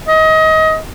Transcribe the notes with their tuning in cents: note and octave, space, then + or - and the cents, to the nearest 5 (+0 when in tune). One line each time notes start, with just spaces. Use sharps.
D#5 +25